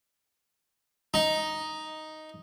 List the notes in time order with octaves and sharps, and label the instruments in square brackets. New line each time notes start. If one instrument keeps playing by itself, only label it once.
[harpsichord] D#4